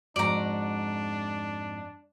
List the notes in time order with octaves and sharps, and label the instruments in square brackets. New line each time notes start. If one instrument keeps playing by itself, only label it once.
[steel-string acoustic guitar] F2 G#2 F#4 [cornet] D4 [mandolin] D5 A#5